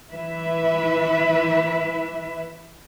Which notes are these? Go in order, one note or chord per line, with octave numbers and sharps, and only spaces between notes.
E3 E4 B4 E5